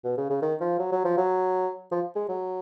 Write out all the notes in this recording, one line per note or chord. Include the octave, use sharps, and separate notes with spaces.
B2
C#3
C#3
D#3
F3
F#3
F#3
F3
F#3
F3
G#3
F#3